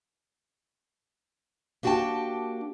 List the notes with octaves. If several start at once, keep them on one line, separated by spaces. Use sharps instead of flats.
A#3 D4 F#4 G4 G5 A5